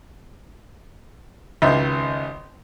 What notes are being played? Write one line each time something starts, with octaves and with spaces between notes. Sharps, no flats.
G#1 C#2 D#3 E5